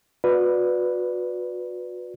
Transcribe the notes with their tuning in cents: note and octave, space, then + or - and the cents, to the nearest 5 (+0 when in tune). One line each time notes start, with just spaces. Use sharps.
F#4 -35 B4 +0 D5 +0